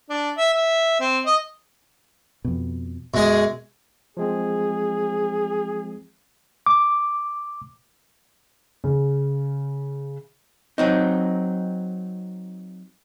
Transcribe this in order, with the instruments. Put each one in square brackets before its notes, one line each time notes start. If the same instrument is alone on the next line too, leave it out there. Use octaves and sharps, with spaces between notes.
[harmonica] D4
E5
E5
C4
D#5
[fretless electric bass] F2 B2
[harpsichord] F#2 G#3 G#4 [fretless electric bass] B2
[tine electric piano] F3 G#3 C4 [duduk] G#4
[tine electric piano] D6
[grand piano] C#3
[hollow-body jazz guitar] F#3 C4 D#4